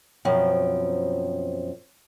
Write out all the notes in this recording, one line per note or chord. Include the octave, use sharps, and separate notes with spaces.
F#2 B2 F3 C4